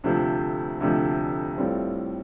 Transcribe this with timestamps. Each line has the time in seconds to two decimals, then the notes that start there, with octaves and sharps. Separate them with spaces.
0.04 D2 C3 F3 A3
0.80 D2 C3 F3 A3
1.58 A2 G3 C4 F4 A4